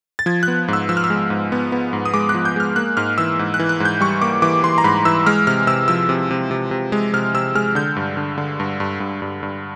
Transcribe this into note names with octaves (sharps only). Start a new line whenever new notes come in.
A6
F3 G#6
F#6
B3
G#2 E6
F3 E6
F6
E6
G#3
G#2
B3
B3
G#2
D#6
G#3 D6
F#6
F3
G6
G#3 F6
A#3 F#6
G#2 F6
E3 E6
G#2
F#6
E3
F#6
G#2
G6
G3 C#6
A#3 D6
E3 D6
E3 C6
A#5
G#2 B5
E3 E6
G#3 F6
C3 F6
C3 E6
F3 E6
C3
C3
C3
C3
G#3
C3 F6
C3 E6
G#3 F6
D3 G6
G2
D3
D3
G2
G2
G2
G2
G2